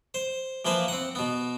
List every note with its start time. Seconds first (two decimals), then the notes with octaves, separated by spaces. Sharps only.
0.14 C5
0.65 E3 F3 A#3 B4 C5
0.88 C4 F#5
1.15 B2 B3